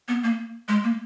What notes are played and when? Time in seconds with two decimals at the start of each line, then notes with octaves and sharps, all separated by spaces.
0.08 B3
0.23 A#3
0.68 G#3
0.84 A#3